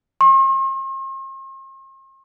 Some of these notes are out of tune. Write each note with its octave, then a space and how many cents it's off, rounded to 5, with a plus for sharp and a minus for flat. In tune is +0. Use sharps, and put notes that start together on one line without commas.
C6 +45